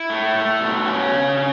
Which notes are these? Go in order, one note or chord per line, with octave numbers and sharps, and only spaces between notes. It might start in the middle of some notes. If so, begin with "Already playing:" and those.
Already playing: E4
A3
A3
B2
C#4
C#3
C#3